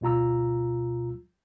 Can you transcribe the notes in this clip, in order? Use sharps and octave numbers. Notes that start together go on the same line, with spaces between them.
D2 B2 F4 A#5 E6